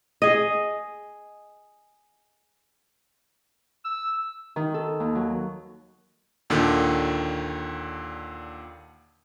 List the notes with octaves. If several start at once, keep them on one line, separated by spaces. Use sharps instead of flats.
G#4 D#5
E6
D#3
A4
D#2
F#3
D#2 A#2 D3 D#3